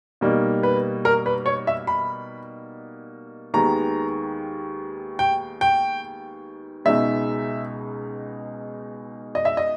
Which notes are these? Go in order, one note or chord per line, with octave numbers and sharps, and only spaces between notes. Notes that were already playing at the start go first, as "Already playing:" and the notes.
B2 G3 A#3 D#4
B4
A#4
B4
C#5
E5
B5
D#2 D#3 G#3 B3 A#5
G5
G5
C#2 B2 G#3 D#4 E5
D#5
E5
D#5